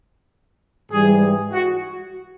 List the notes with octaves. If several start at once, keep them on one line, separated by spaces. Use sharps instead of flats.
G#2 E3 G3 G#4
F#4